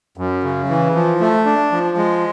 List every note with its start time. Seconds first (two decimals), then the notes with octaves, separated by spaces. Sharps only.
0.17 F#2
0.43 C#3
0.69 E3
0.95 F3
1.21 A3
1.46 D4
1.72 F3
1.97 G#3